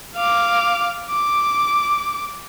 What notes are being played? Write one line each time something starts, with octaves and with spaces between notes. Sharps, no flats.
F5 D6
D6